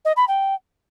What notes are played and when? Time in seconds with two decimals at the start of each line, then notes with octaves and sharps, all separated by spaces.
0.05 D#5
0.16 B5
0.28 G5